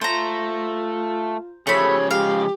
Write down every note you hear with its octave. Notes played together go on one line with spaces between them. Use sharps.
A3 F4 C5 A#5
C#3 F3 A3 G4 C#5 B5
G#3 G4 F5